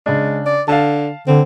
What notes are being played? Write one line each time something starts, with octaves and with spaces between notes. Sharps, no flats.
C#3 G#3 D4
D5
D3 F5 A5
D3 C4